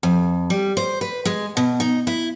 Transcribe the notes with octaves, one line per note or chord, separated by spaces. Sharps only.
F2
G3
C5
B4
G#3
B2
D#4
E4